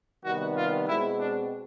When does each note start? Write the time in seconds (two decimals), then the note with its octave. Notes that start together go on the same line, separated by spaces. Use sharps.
0.24 C3 D#3 G3 B3 F#4
0.57 F4
0.88 B2 G#3 C4 E4
1.20 D4